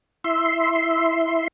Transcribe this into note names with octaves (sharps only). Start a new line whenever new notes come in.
E4 E5 C6